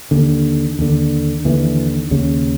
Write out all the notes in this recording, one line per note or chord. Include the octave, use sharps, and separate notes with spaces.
D#2 D3
D#2 D3
D#2 D3 E3
D#2 C#3